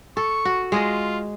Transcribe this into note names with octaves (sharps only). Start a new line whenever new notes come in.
A4 C#6
F#4
G#3 F4 G#4 D#5